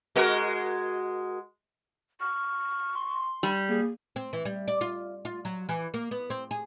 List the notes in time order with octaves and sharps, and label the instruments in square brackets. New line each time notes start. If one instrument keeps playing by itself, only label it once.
[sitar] G#3 F#4 A#4
[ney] C#6 [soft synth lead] F6
[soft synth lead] C6
[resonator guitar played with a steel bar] G3
[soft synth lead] A#3 [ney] G#4
[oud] C4
E3
G3
D5
F4
F4
F#3
E3
A#3
B3
C4
G#4